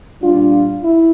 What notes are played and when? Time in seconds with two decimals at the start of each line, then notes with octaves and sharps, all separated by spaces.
0.21 A#2 G3 D4 F4
0.83 E4